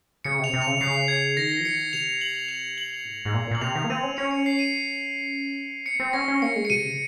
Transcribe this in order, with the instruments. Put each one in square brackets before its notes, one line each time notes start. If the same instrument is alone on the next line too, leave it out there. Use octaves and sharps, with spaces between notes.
[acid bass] C#3 [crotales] C#7
[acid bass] C3 [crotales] F7
[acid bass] C3
[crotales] F7
[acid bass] C#3
[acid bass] C#3 [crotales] C7
[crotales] G#6
[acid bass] D#3 [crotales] A#6
[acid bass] F3
[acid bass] D#3 [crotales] C#7
[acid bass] C3 [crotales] F7
[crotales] F#7
F7
F#7
[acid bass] G#2
G#2
A#2
[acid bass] A#2 [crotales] F#7
[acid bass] C3 [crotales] F7
[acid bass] D#3
A#3
[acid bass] C4 [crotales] D#7
[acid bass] C#4
[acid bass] C#4 [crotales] C#7
[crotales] C#7
C7
D#7
[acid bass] C4 [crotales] C#7
[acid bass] C4
[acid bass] C#4 [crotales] A#6
[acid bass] C#4
[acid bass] A#3 [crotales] C#7
[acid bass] G#3
[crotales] C#7
[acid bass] C3 [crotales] D#7
[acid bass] C#3